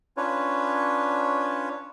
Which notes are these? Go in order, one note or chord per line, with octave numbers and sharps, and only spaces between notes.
C#4 D4 F4 B4 C#5